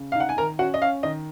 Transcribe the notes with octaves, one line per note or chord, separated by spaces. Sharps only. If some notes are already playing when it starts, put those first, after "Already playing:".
Already playing: C#3
D#4 F5
F#5
G#5
D#3 A#4 A#5
C#4 F#4 F#5
D#5
C#4 F5
D#3 D#5